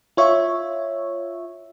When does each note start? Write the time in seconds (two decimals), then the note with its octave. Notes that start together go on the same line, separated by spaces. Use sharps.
0.17 F4 C#5 E5